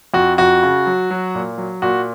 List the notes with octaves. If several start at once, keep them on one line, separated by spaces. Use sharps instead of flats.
F2 F#4
F2 F#4
C#3
F#3
F#3
A#2
F#3
A#2 F#4